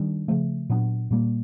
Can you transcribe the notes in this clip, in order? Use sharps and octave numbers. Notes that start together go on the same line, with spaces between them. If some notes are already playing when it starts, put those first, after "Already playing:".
Already playing: D#3 G3 D4
C#3 F3 A3
A#2 F#3 B3 D4
A#2 G3 A#3